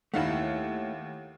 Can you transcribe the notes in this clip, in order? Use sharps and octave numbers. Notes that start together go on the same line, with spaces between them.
D#2 A3 D#4 E4 F5 F#5